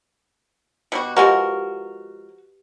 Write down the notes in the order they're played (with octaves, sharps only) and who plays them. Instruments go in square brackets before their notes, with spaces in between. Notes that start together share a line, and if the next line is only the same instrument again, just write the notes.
[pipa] B2 G3 F#4
[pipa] F3 G#3 A#4 [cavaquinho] F#4 [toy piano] G4 B4